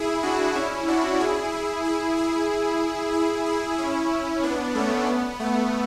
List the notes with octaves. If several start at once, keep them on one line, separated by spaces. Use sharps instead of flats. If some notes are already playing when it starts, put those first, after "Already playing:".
Already playing: E4 G#4
D4 F#4
C#4 E4
D4 F#4
E4 G#4
E4 G#4
E4 G#4
E4 G#4
E4 G#4
E4 G#4
C#4 E4
B3 D4
A3 C#4
B3
A3